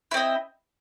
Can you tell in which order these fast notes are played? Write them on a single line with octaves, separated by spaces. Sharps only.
E4 C4 D#5